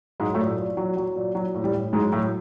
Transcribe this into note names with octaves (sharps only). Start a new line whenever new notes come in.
G#2 F#3 G#3
A2 A3
A#2
A#2
F#3
F#3
A#2
F#3
A2
G3
A2
G#2 F#3 G#3
A2 F#3 A3